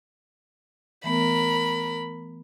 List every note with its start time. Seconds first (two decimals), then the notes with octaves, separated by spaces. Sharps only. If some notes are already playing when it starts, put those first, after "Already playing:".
1.04 E3 A3 B3 A#4 B5